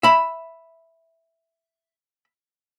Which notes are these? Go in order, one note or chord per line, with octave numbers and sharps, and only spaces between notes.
E5 B5